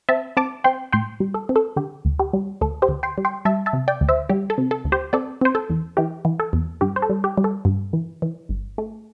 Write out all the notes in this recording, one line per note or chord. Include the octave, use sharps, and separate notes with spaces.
C4 E5 A5
C4 A5 D6
C4 G5 C6
A2 G5 C6
G3
A4
C4
A4
D3 G4
D2
G4
G3
D2 A4
G4 C5
D2
G5 C6
G3
G5 C6
G3 E5 A5
E5 A5
C3
D5 G5
D2
C5 E5
G3 G4
A4
C3
A4
D2
G4 C5
C4 A4 D5
C4 C5
A4
E2
E3 G4
E3
A4
E2
G2 G4
C5
A4
G3
G4
G3
A4
G2
E3
E3
G1
A3